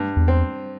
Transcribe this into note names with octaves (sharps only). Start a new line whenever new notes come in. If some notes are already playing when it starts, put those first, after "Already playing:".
Already playing: G2
E2
C4